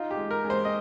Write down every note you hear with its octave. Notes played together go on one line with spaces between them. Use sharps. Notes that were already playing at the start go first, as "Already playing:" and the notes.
Already playing: D#4 F4
G4
G#3
A#4
G#3
C5
D#5